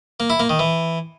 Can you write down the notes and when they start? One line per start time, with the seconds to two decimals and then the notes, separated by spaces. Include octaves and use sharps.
0.20 A#3
0.30 E4
0.40 A#3
0.49 D#3
0.59 E3